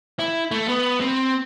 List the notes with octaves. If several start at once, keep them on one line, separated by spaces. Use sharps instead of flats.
E4
A3
B3
C4